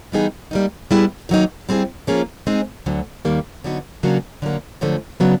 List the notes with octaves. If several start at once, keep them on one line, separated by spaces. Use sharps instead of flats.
E3 G3 B3 D#4 G#4
G3 A#3 D#4
G3 B3 E4 G#4 B4
D#3 F#3 A#3 D#4
G3 C4 E4 G#4
F3 A#3 C#4 F4 G#4
G#3 C4 D#4 G#4
D2 D3 F#3
D#2 D#3 G3 A#3
D3 F#3 B3 D#4 F#4
C#3 F#3 A#3 D4 F#4
D3 F#3 A#3
F#2 D3 F3 A3
C#3 F#3 B3 D4